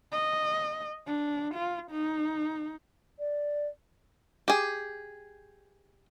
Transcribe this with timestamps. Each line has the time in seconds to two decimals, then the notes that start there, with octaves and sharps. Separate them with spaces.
0.12 D#5
1.06 D4
1.54 F4
1.91 D#4
3.19 D5
4.48 G4 G#4